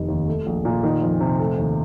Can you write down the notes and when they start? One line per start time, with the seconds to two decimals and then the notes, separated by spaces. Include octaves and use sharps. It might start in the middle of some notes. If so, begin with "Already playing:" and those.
Already playing: F1 D#3
0.08 D#2
0.28 A3
0.46 A#1
0.65 A#2
0.83 D#3
1.02 F2
1.20 C3
1.39 A3
1.58 D#2